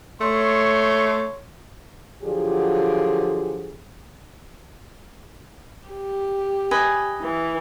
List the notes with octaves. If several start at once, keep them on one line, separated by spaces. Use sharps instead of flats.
A3 C#5 C6
D3 F3 F#3 F4 G4 G#4
G4
B4 D#5 G#5
E3